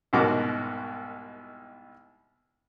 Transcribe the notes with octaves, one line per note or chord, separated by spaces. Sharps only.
C2 G#2 B2 F#4 A#4 D6